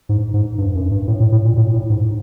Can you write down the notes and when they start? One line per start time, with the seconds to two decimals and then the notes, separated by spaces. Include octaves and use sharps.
0.09 G#2
0.34 G#2
0.58 G2
0.75 F#2
0.91 G2
1.08 A2
1.20 A2
1.32 A2
1.45 A#2
1.57 A2
1.73 A2
1.90 G#2